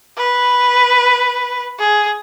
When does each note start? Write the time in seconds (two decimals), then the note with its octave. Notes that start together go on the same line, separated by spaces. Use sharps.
0.18 B4
1.79 G#4